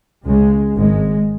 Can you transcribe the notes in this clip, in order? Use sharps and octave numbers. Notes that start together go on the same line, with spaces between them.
C#2 C#3 G#3
G#1 G#2 G#3